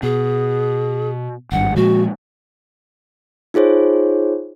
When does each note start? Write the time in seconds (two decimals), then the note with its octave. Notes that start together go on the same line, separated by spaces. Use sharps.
0.03 B2 G#4
1.52 G#1 G2 F#5
1.76 A#2 F3 G#3 F#4
3.54 D#4 F4 G#4 C5 C#5